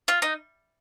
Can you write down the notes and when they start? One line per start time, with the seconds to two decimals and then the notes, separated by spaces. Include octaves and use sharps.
0.08 F4
0.22 D#4